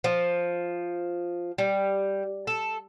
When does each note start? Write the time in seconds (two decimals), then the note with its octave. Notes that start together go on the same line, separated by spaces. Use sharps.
0.04 F3
1.58 G3
2.47 A4